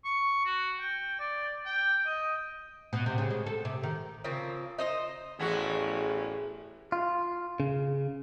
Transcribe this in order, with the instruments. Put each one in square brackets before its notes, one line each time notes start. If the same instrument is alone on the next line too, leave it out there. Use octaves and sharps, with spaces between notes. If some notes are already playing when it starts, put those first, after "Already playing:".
[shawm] C#6
F#4
G5
D5
G5
D#5
[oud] B2
C3
C#3
G#3
A4
C3
D#3
[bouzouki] C#3 F3 A#3 C4
D#4 C5 D#5
[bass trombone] A1 [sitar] E2 E3 F#4 [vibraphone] G#4
[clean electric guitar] F4
C#3